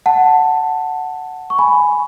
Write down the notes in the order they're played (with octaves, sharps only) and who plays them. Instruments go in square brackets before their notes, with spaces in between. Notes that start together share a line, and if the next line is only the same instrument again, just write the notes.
[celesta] F#5 A5
C#6
G#5 B5